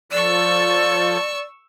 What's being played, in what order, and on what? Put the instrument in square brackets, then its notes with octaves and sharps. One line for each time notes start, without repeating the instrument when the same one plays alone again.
[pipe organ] F3 A4 [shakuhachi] D5 [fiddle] C#6 E6